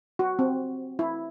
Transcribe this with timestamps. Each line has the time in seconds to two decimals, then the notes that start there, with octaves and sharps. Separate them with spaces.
0.19 F#4
0.39 C4
0.99 E4